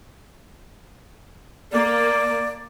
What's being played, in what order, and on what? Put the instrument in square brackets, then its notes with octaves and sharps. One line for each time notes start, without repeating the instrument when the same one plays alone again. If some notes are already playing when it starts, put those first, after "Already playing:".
[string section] A#3 [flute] D5